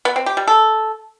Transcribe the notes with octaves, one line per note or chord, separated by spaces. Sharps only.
B3
C4
G4
G3
A4